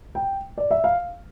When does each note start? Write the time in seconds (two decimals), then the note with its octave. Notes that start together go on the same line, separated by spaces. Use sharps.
0.15 G5
0.58 D5
0.71 E5
0.84 F5